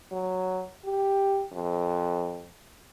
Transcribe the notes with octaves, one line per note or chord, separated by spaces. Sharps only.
F#3
G4
F2